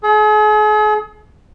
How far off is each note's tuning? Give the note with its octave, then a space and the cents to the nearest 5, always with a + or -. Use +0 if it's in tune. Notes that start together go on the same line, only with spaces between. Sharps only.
G#4 +40